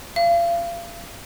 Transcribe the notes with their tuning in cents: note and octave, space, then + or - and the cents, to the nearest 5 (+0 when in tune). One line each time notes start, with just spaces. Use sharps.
F5 -35